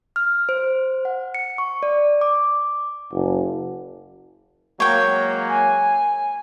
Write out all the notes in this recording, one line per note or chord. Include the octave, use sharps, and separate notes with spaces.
F6
C5
F#5
C#7
C#6
D5
D6
F#1
F#3 G#3 A#3 C#5 G5
G#5